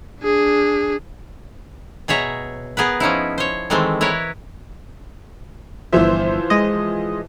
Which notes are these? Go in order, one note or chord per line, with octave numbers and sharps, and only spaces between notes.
D4 G#4
B2 G#4 C#5 E5 A#5
B3 G#4 A#4 B4
F3 C#4 D#4 E4
C5 C#5
D#3 E3 G#3 A3 C4
E4 A#4 B4 C#5
G1 E3 F3 C5 E5
G#3 D#5